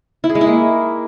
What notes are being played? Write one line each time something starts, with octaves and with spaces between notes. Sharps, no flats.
E4
G#4
G#3
E4
A#3